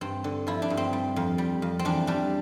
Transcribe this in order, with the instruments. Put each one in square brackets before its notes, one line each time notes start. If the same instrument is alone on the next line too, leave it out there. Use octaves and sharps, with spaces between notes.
[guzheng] G2 C4
D3
F3 E4
D4
G2
C4
G3
F2
G3
F2
C4
E2 D4
G3 D4